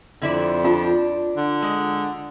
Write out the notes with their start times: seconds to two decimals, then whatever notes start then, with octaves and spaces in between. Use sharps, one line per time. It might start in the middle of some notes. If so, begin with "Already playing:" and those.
0.22 F2 D3 E4 D5
0.65 D4 F4
1.37 D3
1.62 G#3